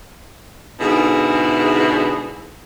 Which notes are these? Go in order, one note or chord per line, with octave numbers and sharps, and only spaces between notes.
G#2 B2 D3 E4 G#4